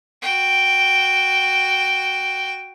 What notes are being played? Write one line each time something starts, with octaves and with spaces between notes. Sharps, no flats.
F#4 G5